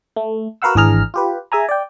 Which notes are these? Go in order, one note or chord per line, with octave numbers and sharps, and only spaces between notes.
A3
F#4 A#4 B4 F5 F#5 E6
G#1 E3 D4 G#4 A#5 F6
F4 G4 B4
G#4 E5 G#5 A#5
D5 G5